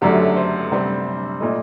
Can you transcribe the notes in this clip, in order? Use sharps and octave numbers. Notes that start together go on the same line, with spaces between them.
F#1 F#2 D3 F#3 A3 G4
A4
C5
D2 C3 G3 C4
A#2 A3 D#5